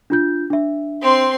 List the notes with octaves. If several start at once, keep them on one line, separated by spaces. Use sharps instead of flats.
D4 F4 G6
D4 E5
C4 C6